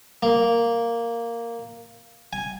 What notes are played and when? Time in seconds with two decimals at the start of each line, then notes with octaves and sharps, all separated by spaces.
0.23 A#3
2.33 G#5